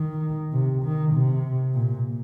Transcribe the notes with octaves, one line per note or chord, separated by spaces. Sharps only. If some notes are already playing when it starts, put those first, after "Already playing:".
Already playing: D#3
C3
D#3
C3
A#2